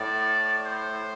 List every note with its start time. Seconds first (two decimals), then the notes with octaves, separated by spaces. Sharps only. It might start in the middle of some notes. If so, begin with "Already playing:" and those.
Already playing: A2 D5
0.65 C5